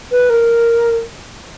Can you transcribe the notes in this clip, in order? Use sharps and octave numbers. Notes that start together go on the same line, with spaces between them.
B4
A#4